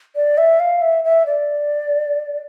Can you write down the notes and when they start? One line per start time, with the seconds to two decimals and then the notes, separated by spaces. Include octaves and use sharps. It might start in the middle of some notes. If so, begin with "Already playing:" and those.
0.16 D5
0.38 E5
0.60 F5
0.82 E5
1.04 E5
1.26 D5